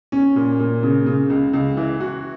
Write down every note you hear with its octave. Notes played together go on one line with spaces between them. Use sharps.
C#4
A#2
A#2
C#3
C#3
C#2
C#2
E3
F#4